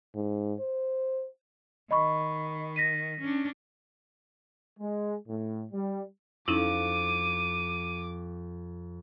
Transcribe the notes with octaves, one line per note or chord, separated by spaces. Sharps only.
G#2
C5
D#3 D#5 B5 C#6
A#6 B6 D#7
C#4 D4
G#3
A2
G3
F2 C#4 D#4 E4 D6 D#7